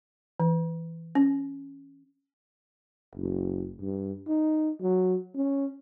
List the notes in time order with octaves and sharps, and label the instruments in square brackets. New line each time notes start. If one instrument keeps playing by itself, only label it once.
[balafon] E3
C#4
[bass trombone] F#1
G2
D#4
F#3
C#4